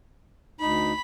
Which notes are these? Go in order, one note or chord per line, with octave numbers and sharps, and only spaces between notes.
D2 D#4 B5